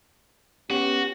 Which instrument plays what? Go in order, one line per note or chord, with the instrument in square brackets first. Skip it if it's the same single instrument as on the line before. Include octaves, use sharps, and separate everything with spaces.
[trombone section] B3 C#4 G4 [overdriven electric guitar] F#4